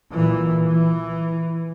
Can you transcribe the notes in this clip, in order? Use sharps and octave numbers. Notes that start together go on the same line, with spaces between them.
A#2 E3
E3